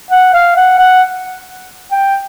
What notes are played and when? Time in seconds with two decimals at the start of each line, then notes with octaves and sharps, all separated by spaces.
0.11 F#5
0.34 F5
0.56 F#5
0.78 F#5
1.92 G5